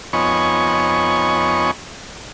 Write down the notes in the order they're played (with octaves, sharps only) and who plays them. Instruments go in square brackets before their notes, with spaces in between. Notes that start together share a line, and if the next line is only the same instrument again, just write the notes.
[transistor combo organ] F2 B3 D#4 C#5 G#5 C#6